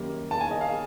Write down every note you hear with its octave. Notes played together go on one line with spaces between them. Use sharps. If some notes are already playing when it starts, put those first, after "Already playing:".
Already playing: F#2 D#3 G3 A#3
A5
G#5
D#5
F5